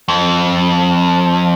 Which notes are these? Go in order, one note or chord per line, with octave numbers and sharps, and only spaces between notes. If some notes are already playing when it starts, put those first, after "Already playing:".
F2